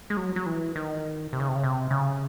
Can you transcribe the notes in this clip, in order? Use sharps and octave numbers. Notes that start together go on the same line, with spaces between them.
G#3
F#3
F#3
E3
D#3
C3
C#3
C3
C#3
C3
C#3